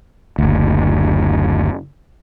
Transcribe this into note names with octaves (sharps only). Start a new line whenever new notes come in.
F#1 D2